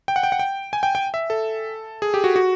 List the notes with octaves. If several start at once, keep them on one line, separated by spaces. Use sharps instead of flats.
G5
F#5
G5
F#5
G5
G#5
G5
G5
E5
A4
G#4
G4
F#4
F#4